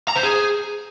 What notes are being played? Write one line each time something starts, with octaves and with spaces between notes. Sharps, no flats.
A#5
C5
G#4